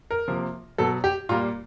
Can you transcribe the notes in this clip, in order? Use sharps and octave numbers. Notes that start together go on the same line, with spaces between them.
A#4
C3 F3 A#3
B2 F#3 B3 A4
G4
A#2 G3 A#3 F4